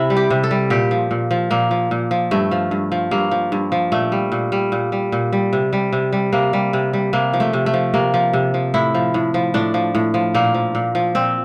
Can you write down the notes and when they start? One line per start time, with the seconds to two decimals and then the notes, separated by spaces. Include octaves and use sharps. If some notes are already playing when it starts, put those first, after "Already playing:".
Already playing: C3 E4
0.10 G3
0.17 G4
0.30 C3
0.44 A4
0.51 G3
0.70 A#2 G4
0.91 F3
1.11 A#2
1.31 F3
1.51 A#2 A#3
1.71 F3
1.91 A#2
2.11 F3
2.31 G2 A3
2.51 F3
2.71 G2
2.92 F3
3.11 G2 A#3
3.31 F3
3.52 G2
3.72 F3
3.92 A#2 A3
4.12 G3
4.32 A#2
4.52 G3
4.72 A#2
4.92 G3
5.12 A#2
5.33 G3
5.53 C3
5.73 G3
5.93 C3
6.13 G3
6.33 C3 A#3
6.53 G3
6.73 C3
6.93 G3
7.13 C3 A#3
7.33 F3
7.40 A3
7.53 C3
7.66 A3
7.74 F3
7.94 C3 A#3
8.14 F3
8.33 C3
8.54 F3
8.74 A2 E4
8.94 F3
9.14 A2
9.34 F3
9.54 A2 D4
9.74 F3
9.95 A2
10.14 F3
10.34 A#2 A#3
10.54 F3
10.75 A#2
10.95 F3
11.15 A#2 C4